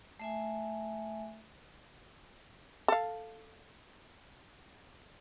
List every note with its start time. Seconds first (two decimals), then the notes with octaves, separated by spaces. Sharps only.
0.20 A3 E5 G#5
2.88 A4 F5